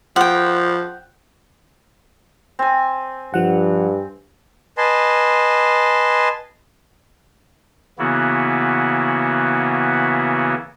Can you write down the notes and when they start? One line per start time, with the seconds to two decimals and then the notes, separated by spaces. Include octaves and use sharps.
0.16 F3 F#5 G5
2.59 C4 G#5
3.34 G2 F3 F#5
4.78 B4 D#5 G#5 A5 C6
7.99 C#3 E3 A#3 B3 E4 F#4